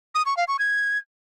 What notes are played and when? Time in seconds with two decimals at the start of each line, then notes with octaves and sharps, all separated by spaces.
0.15 D#6
0.26 C#6
0.37 F5
0.48 C#6
0.59 G#6